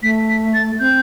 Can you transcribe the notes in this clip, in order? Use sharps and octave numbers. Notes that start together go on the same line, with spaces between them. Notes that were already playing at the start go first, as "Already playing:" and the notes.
A3 B6
B6
A6
C4 G6